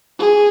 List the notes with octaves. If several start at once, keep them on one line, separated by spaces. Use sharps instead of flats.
G#4